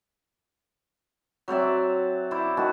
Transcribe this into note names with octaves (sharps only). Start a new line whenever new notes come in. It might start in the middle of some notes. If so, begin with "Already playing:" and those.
F#3 C4 D5 E5
E4 C5 D5
D#3 F#4 A5